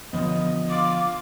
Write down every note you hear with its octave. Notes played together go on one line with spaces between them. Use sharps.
D3 F3 B3 D#5
F4 D6